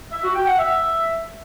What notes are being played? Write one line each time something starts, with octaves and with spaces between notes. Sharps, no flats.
E5
F#4
G5
F#5
E5